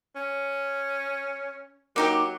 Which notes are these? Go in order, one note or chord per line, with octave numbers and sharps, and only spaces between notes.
C#4
F#3 A#3 D#4 G4